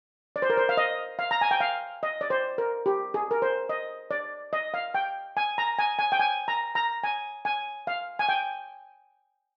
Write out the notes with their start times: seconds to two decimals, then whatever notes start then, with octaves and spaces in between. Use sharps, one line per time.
0.36 D5
0.42 C5
0.50 A#4
0.57 C5
0.69 F5
0.77 D#5
1.19 F5
1.31 A#5
1.41 G#5
1.51 G5
1.60 F5
2.03 D#5
2.21 D5
2.30 C5
2.58 A#4
2.86 G4
3.14 G#4
3.31 A#4
3.42 C5
3.69 D#5
4.11 D5
4.53 D#5
4.74 F5
4.94 G5
5.37 G#5
5.58 A#5
5.79 G#5
5.99 G#5
6.12 G5
6.20 G#5
6.48 A#5
6.75 A#5
7.04 G#5
7.45 G#5
7.87 F5
8.19 G#5
8.29 G5